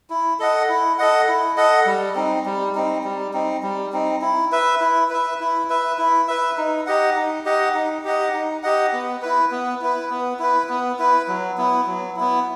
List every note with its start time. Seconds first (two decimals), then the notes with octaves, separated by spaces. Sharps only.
0.10 E4
0.39 A4 D#5 F#5
0.69 E4
0.98 A4 D#5 F#5
1.28 E4
1.57 A4 D#5 F#5
1.86 G3
2.15 C4 D#4
2.46 G3
2.75 C4 D#4
3.04 G3
3.33 C4 D#4
3.63 G3
3.93 C4 D#4
4.21 E4
4.52 B4 E5
4.81 E4
5.10 B4 E5
5.40 E4
5.70 B4 E5
5.98 E4
6.28 B4 E5
6.57 D#4
6.86 G4 D#5 F#5
7.16 D#4
7.45 G4 D#5 F#5
7.75 D#4
8.05 G4 D#5 F#5
8.34 D#4
8.63 G4 D#5 F#5
8.93 B3
9.22 E4 B4
9.51 B3
9.81 E4 B4
10.10 B3
10.39 E4 B4
10.69 B3
10.99 E4 B4
11.28 F#3
11.58 B3 E4
11.87 F#3
12.16 B3 E4